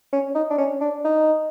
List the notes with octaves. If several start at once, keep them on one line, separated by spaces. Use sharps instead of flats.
C#4
D#4
D4
C#4
D4
D#4